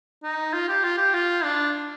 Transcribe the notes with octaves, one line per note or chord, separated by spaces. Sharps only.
D#4
F4
G4
F4
G4
F4
D4